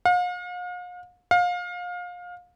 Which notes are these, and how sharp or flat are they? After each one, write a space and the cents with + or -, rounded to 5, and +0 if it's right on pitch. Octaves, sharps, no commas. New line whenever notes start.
F5 +45
F5 +30